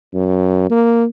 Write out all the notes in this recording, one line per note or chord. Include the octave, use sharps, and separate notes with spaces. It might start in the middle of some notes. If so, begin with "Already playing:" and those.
F#2
A#3